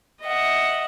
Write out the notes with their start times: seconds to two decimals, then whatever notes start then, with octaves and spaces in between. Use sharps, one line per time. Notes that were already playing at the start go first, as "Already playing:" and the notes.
0.23 D#5 E5 F#5